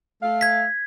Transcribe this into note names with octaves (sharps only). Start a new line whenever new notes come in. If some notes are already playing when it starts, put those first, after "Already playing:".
A3 F5
G#6 B6